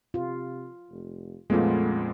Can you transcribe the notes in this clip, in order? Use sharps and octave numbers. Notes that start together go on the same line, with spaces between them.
C3 F4
F1
F2 A#2 G#3 A3 B3 C#4 F4